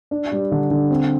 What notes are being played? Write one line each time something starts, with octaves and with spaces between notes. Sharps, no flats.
D4
G3
D3
D3
C4